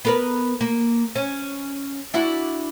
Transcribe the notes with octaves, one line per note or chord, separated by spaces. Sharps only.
B3 A#4 B4
A#3
C#4
D4 E4 F#4